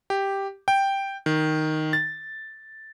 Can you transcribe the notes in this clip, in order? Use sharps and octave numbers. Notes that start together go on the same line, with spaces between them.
G4
G5
D#3
A6